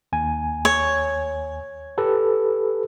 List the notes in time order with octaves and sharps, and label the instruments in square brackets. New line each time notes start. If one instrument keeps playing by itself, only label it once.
[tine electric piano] D#2 G#5
[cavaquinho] C#5
[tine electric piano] G4 A4 B4